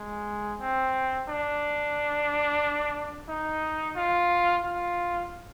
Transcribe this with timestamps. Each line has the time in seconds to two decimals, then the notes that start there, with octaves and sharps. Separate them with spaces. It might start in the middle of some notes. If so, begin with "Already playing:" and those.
Already playing: G#3
0.60 C4
1.29 D4
3.29 D#4
3.96 F4
4.64 F4